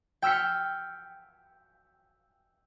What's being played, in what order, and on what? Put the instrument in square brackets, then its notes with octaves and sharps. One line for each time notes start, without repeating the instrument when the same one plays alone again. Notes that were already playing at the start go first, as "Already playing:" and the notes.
[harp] G5 E6 F6 B6 C#7